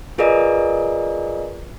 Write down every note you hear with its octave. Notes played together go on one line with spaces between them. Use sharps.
F4 G#4 A#4 B4 D5 D#5